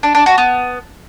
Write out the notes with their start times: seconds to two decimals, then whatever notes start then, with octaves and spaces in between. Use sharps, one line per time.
0.03 D4
0.15 D4
0.26 F#4
0.38 B3